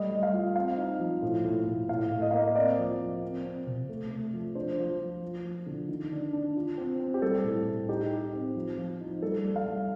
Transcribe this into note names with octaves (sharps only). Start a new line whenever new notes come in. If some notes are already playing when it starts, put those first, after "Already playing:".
Already playing: G3 A3 D#5
G3
F5
F4
C4 F5
D#4
F3
A2
A2
A2
A2 F5
A2
D#5
A#3 F5
D#5
C4 D5
F3
F3
C4
C4
C3
A3
A3
F3
D4 C5
F3
F3
F3
F3
D3
D#3
D4
D4
F4
C4
C4
G4
G3 A4
A2
A2
D#4 G4
D#4
C4
F3
F3
D#4
G3 A4
G3
F5
G3